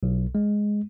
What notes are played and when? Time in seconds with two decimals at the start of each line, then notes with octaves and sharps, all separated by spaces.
0.03 B1
0.35 G#3